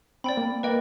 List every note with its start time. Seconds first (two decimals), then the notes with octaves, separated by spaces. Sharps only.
0.24 C4 D5 G5 B5
0.37 A#3
0.63 A#3 B4 D#5 G5